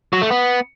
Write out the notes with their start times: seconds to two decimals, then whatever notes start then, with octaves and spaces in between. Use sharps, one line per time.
0.13 F#3
0.22 A3
0.30 B3